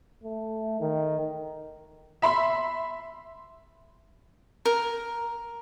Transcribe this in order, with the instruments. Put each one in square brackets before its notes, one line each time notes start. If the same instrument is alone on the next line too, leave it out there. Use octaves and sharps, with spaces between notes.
[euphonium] A3
D#3
[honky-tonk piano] E5 B5 C6
[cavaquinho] A#4